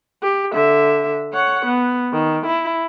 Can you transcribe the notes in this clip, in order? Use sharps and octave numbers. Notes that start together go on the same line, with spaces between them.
G4
D3 E5
C#5 F#5
B3
D#3
E4